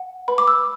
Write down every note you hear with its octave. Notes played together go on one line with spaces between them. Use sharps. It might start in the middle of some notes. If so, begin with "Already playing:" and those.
Already playing: F#5
B4 B5
D6
E6